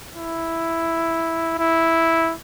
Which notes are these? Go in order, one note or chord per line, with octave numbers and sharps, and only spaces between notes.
E4
E4